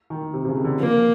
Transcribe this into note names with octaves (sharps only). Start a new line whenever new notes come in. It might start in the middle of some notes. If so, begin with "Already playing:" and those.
D#3
C3
C3
C#3
D#3
D3
F3 A#3